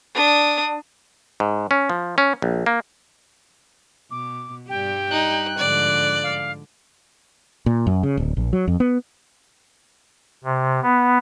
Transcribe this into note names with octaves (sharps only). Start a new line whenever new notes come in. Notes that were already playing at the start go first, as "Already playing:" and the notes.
D4 D#6
G#2
C#4
F3
C#4
A#1
A#3
B2 D6
G2 G3 G4 G5
D#4 F#6
G#2 D3 F3 D5
F5
A#2
F#2
C#3
D1
A#1
F#3
F2
B3
C3
B3